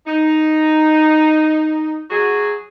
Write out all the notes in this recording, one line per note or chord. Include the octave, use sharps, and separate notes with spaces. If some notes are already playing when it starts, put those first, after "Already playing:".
D#4
F#3 F#4 G#4